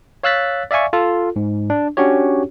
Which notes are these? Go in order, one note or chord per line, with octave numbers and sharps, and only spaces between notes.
C#5 F5 E6 F#6 A6 B6
D5 E5 F5 G#5 C#6
F4 A4
G#2
D4
C#4 D4 F#4 G4 C#5